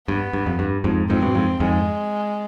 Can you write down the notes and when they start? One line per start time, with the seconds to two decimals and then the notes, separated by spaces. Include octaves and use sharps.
0.08 G2 B3
0.33 G2
0.46 F2
0.59 G2
0.84 F2 G#2
1.10 F2 G#2 C4
1.22 G2 B2
1.35 F2 G#2
1.60 F2 G#2 G#3